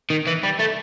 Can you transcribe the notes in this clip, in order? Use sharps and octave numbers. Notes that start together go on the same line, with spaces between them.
D#3
E3
G3
A3